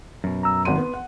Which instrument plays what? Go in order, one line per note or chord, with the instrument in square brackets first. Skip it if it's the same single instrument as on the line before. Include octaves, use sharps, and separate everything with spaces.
[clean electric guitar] F#2 B2
[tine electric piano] A#5 E6
[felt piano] G#1 F#5 D#7 [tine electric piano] C6
[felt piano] B3
F#5